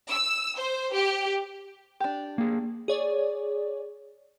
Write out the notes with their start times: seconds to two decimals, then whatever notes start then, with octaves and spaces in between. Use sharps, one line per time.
0.11 E6
0.60 C5
0.94 G4
2.00 D4 G4
2.38 A#3 G#4
2.88 G#4 C#5 D5